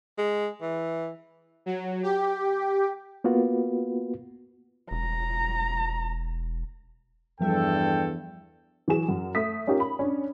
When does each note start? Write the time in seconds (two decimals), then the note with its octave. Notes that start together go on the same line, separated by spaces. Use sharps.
0.18 G#3
0.62 E3
1.66 F#3
2.03 G4
3.24 A#3 B3 F4 F#4 B4
4.91 E1 A#5
7.41 E2 G2 F3 G3 A4 E5 G5
8.88 E3 F#3 F#4 G#4 E7
9.09 F#2
9.35 A3 D#6 B6
9.67 C#4 D#4 F4 G4 A#4
9.80 B5
9.99 C#4 D4